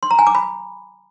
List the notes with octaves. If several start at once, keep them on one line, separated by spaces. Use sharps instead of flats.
C6
A#5
G#5
D6
B5